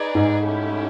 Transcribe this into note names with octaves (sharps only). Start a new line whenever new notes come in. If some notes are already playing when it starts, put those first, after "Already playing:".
Already playing: D#4 G#4 B4 D5
G#2
A3 C#4 E4 G4